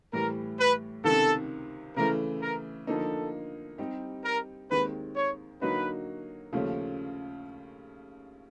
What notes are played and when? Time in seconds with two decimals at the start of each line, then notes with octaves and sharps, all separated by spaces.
0.13 A2 E3 G3 A#4
0.59 B4
1.04 C#2 C3 D#3 A4
1.96 C#3 E3 A3 A#4
2.42 A#4
2.87 D3 F3 A#3 D#4 A4
3.78 G3 C4 D#4 G4
4.25 A#4
4.70 D#2 D#3 G#3 C4 B4
5.16 C#5
5.61 D3 F#3 A#3 D#4 F#4 B4
6.53 D#2 C#3 F3 A3 C#4